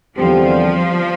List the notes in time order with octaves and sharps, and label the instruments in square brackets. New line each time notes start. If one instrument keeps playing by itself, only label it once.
[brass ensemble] E2 D3 G3 C4 G4 [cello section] F3